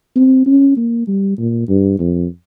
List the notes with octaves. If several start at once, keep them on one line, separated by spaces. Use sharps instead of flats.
C4
C#4
A#3
G3
A#2
G2
F2